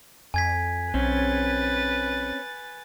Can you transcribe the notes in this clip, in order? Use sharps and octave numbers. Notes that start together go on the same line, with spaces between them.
F2 G#5 G#6 B6
B1 C4 C#4 B4 A6